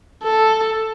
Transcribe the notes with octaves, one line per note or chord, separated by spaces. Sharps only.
A4